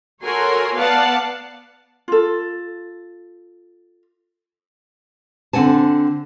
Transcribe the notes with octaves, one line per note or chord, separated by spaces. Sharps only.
F#4 A4 A#4 C#5 G#5 C6
B3 B4 D5 F5 F#5 A5
F4 A4
D3 C4 F#5 G#5 A5